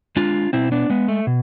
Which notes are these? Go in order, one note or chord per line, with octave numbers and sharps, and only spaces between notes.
G#3 D4 F4
B2 C4 E4
B3 D4
G#3 B3
A3
B2